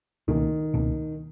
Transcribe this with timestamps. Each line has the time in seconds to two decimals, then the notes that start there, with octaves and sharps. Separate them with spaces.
0.28 C#2 B2 D#3 A#3 C#4
0.74 C#2 B2 A#3 C#4